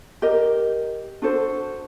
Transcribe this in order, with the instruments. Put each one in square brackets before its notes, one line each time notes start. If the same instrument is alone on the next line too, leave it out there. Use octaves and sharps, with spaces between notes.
[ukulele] G4 A#4 D#5
D4 F#4 A4 C5